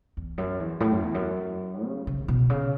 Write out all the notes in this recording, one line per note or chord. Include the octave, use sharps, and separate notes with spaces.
E2
F#2
E2
A2
F#2
E2
F#2
C#3
C#3
B2
C#3